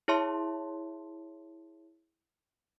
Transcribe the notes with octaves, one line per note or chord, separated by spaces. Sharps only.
E4 G#4 C#5 E5 A5 C6